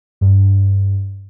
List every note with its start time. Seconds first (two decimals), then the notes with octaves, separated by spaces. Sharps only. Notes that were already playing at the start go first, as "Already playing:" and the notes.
0.21 G2